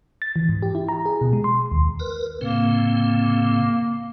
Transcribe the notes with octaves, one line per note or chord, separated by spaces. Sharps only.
A6
E3
G#2
G4
E4
A#5
G#4
B2
G#3
C6
D#2
A#4 B4
A2 C#3 A#3 C4